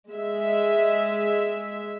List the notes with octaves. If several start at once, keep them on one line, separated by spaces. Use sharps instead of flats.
G#3 E5